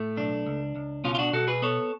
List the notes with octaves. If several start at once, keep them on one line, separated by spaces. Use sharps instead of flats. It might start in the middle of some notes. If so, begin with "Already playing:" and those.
Already playing: A2 A3
B1 D4
C#2
C#2
B2 C#4 F4
F4
D4 F#4
B2 F#4 A4
G#4 B4
B3 A4 C#5